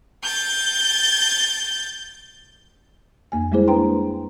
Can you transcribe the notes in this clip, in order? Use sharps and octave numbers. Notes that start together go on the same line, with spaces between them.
G6 A6
F2 A#3 G#5
G3 G#3 A#3 E4 G#4 C5
D4 B4 G5 A#5 C6